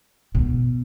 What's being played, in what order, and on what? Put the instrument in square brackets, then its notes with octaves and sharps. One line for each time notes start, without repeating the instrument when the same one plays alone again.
[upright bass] B2